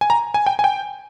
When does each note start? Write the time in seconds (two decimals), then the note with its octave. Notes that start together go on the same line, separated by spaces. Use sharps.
0.01 G#5
0.10 A#5
0.34 G#5
0.46 G5
0.59 G#5
0.64 G5